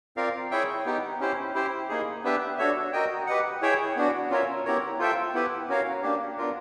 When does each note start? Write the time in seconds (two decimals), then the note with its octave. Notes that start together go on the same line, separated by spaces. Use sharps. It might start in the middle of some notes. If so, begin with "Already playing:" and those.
0.17 C4 F4 A#4 D5 F5
0.51 E4 G#4 C#5 E5 G5
0.86 B3 D#4 G4
1.20 C#4 E4 G4 C5
1.55 E4 G4 C5
1.89 A#3 D#4 G#4
2.24 B3 D4 G4 B4 E5
2.58 D4 F#4 A4 C#5 E5
2.93 F#4 A#4 D#5 G5
3.27 G4 B4 D#5 F#5
3.62 E4 G#4 C#5 E5 G5
3.96 B3 D4 F#4
4.30 C#4 F4 A#4 C#5 E5
4.65 B3 E4 G4 A#4 C#5
4.99 F4 A4 C5 E5 G5
5.34 B3 E4 G4 B4
5.69 C#4 F#4 A#4 C#5 F5
6.03 A#3 D4 G4
6.38 B3 D4 F4 A#4